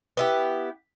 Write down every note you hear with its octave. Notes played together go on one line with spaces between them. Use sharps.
B3 E4 G4